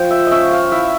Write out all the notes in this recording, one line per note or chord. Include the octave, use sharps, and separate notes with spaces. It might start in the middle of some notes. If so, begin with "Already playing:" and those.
Already playing: F3 G5
E5
C#4 D#5 E5
F5
E4 E5